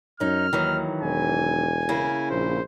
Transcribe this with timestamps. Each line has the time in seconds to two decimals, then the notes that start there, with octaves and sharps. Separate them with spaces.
0.20 F#2 C#4 D#4 F6
0.53 D#2 D#3 E3 F#3
1.01 E1 G#5
1.89 C#3 A#3 E4
2.30 A#1 C5